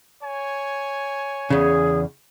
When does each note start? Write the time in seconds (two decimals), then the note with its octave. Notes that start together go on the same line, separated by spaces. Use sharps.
0.23 C#5 G#5
1.50 E2 C#3 G#4